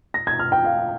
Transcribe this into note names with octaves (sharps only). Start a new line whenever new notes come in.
A#6
G#6
F6
G5
F5